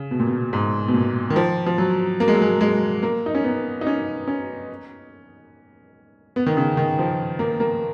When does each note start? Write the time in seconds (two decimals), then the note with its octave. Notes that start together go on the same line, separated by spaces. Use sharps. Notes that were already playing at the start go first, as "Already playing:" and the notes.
Already playing: C#3
0.11 B2
0.20 A#2
0.27 B2
0.53 G#2
0.88 B2
0.94 A#2
1.30 D#3
1.36 F3
1.66 F3
1.78 F#3
2.20 A#3
2.28 G#3
2.35 F#3
2.41 G#3
2.61 G#3
3.03 A#3
3.26 D#4
3.35 C#4
3.44 B3
3.81 D#4
3.87 C#4
4.28 C#4
6.36 B3
6.46 D#3
6.57 C#3
6.77 D#3
6.99 F3
7.39 A#3
7.60 A#3